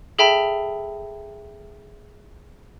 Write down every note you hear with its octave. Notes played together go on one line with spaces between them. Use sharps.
G#4 A4 E5 G5 A5 B5